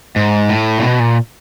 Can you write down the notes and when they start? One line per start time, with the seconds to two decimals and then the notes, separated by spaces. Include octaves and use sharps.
0.16 G#2
0.49 A2
0.78 A#2
0.82 B2
1.00 A#2